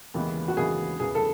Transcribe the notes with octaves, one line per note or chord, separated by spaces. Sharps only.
D#2 C#3 E3 G#3 B3
F#4
D#2 C#3 E3 G#3 B3 G#4
E2 C#3 E3 B3 G#4
A4